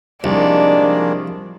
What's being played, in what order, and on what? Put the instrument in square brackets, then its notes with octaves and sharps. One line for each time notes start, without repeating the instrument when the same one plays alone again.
[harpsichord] C2 [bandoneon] D#3 G#3 A#3 [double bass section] F3 [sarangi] D4